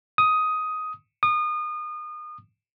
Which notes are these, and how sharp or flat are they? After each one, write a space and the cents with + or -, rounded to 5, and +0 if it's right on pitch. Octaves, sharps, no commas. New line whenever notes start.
D#6 +10
D#6 -30